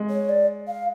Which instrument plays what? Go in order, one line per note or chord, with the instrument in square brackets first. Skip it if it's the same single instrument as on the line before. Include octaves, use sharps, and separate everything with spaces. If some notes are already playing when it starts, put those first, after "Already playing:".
Already playing: [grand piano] G#3
[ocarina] C#5
D5
F5